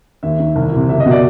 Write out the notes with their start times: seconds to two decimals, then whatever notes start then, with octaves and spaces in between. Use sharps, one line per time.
0.23 D#2 E5
0.39 D#3
0.56 C2
0.72 C3 E3
0.89 F#1 E5
1.00 D#5
1.05 B2
1.11 D5